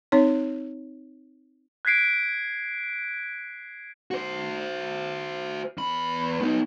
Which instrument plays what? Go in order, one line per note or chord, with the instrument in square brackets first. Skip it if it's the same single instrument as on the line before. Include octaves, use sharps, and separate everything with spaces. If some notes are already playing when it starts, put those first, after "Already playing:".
[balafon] C4 D#4 C#5
[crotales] F#6 G#6 B6 C7 D7
[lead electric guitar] F#4 C5
E2 B5
B3 D#4